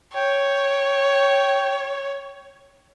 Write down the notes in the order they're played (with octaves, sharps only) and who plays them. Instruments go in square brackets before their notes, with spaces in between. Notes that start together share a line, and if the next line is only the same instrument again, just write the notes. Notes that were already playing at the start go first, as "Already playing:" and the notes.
[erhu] C#5 [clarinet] G5